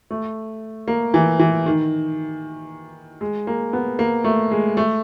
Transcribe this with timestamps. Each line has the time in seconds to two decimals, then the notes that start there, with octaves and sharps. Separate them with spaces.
0.11 A3
0.88 A#3
1.14 E3
1.39 E3
1.66 D#3
3.21 G#3
3.47 A#3
3.73 B3
3.99 A#3
4.24 A3
4.51 G#3
4.77 A3